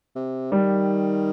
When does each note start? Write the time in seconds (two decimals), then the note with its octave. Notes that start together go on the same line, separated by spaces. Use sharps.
0.16 C3
0.52 D#3 G3